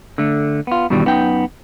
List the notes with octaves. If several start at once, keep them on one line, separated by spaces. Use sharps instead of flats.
D3 A3
B3 F4
G2 B2 D#3 E3 G3
F#2 B3 D#4 G5